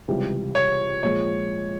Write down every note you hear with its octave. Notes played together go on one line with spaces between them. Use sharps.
C#2 C3 E3 G3
C#5
A#2 F3 G#3 C#5